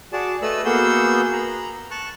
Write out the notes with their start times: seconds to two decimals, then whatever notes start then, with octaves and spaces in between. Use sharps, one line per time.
0.13 F#4 G#4 D5 A5
0.42 A3 A4 B4 D#5 B5 E6
0.65 A#3 B3 F#4 G#4 E6 G6
1.33 A#5 B5
1.91 A5 C#6 F#6